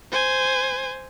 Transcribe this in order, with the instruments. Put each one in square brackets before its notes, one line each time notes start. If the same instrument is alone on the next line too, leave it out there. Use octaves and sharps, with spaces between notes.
[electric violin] C5 G#5